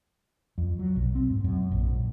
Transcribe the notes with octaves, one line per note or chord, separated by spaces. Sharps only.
F2
F#3
B1
C4
G#2
F#2
A#1